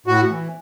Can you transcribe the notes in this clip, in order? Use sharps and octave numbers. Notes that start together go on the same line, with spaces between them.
A2 F#4
E3